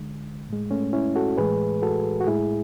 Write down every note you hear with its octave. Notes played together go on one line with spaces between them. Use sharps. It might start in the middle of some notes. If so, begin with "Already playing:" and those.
Already playing: D2 D3 G#3
A2 G#3
A3 C#4
C#4 E4
F#4 A4
A2 E3 G#3 G#4 B4
F#4 A4
F#4
A2 G#3 E4 G#4